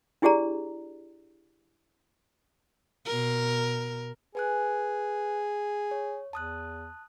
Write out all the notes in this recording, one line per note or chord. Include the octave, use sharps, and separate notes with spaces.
D4 E4 G4 G#4 D5 A#5
B2 A#4
G#4 B4 G#5 F#6
C#5
E2 A5 D#6 F#6